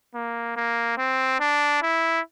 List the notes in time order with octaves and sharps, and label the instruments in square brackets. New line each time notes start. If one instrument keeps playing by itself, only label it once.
[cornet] A#3
A#3
C4
D4
E4